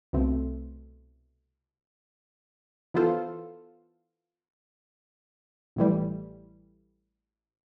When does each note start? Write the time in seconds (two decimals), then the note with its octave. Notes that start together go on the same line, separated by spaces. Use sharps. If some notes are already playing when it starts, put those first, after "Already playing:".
0.13 C2 B2 A3 C4
2.94 E3 B3 F4 A4 C5
5.76 A1 A2 E3 G3